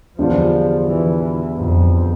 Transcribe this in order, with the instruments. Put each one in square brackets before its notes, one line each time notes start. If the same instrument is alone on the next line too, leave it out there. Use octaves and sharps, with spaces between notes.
[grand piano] E2 D3 G3 D4 F4 [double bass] F3
[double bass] E3
F2